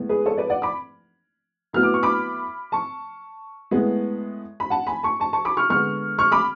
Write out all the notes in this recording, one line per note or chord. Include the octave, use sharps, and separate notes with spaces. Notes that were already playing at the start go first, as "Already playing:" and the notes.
Already playing: A2 G#3 B3
G#4 B4
A4 C#5
B4 D5
D5 F#5
B5 D6
A2 F#3 B3 F6
D6
C#6
B5 D6
A5 C#6
A2 G#3 B3
B5
F#5 A5
G#5 B5
A5 C#6
A5 C#6
A5 C#6
B5 D6
C#6 F6
D3 G#3 B3 C#6 F6
C#6 F6
B5 D6